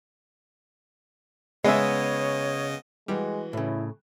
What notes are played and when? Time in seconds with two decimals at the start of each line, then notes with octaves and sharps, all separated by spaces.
1.64 C#3 G#3 B3 C#5 D#5 E5
3.08 E3 G3 G#3 F#4
3.53 A2 C#3 E4